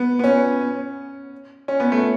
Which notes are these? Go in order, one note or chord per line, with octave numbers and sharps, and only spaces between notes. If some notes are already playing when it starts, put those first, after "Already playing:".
Already playing: B3
B3
C#4
C#4
B3
A3